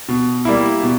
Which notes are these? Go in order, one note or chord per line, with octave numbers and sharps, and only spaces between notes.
B2
G3 A#3 E4
B2